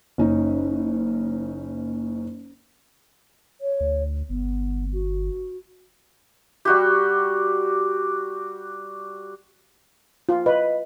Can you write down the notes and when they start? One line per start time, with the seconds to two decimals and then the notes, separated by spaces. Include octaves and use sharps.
0.18 F#1 C#4 D#4
3.61 C#5
3.80 D2
4.29 G1 B3
4.93 F#4
6.65 G3 F#4 G4
10.29 F4
10.46 B4 D#5